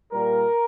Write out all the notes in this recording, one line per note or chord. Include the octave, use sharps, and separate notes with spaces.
A#2 G3 A#4